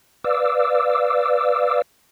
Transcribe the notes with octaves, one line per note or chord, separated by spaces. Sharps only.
B4 D5 F5 D6 E6